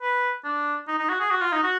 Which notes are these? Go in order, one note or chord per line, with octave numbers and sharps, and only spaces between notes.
B4
D4
D#4
D#4
F#4
G#4
F#4
F4
D#4
F#4